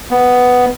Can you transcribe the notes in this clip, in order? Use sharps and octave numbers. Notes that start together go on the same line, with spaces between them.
B3